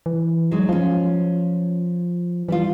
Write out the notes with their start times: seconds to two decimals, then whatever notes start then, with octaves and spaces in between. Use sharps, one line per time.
0.06 E3
0.51 F#3 G#3 D#4
0.69 F3 C#4 F4
2.49 E3 G3 D4 F4